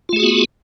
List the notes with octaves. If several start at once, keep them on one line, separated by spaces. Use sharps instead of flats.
A3 B3 F4 F#4 G#4